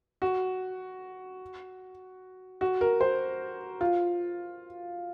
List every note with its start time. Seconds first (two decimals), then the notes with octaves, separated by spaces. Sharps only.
0.22 F#4
2.61 F#4
2.81 A#4
3.01 C5
3.81 F4